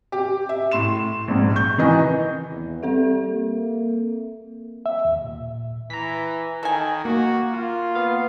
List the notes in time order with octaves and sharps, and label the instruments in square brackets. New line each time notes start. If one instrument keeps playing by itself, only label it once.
[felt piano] G4
E5
A2 C6 E7
A#1 G#2
C#6 G6
D#3 E3 D#5 G#5
[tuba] E2
[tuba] G3 [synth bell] C4 A4 E5
[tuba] A#3
[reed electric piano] E5
D#2
A#2
[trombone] E3 [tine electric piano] A#5 B6
[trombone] D#3 [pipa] A4 G#5
[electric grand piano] A#3 [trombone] F#4
[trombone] F4
[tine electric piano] B3 F5